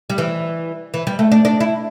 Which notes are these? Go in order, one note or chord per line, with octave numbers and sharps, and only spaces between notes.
G3
E3
E3
G3
A3
D4
D4
E4